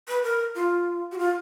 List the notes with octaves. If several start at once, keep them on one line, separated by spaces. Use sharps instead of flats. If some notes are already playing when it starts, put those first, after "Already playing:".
B4
A#4
F4
F#4
F4